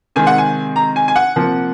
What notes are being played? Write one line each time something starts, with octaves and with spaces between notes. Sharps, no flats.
C3 D#3 G#3 C4 G#5
F#5
G#5
A#5
G#5
G#5
F#5
C3 F3 A#3